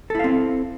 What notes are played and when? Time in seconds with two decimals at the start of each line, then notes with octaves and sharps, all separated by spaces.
0.10 A4
0.15 E4
0.19 F5
0.24 C4